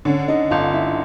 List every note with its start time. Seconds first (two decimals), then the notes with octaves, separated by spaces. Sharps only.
0.05 D3 C#4 C#5
0.28 D#4 D#5
0.51 G1 F4 F5
0.74 E4 E5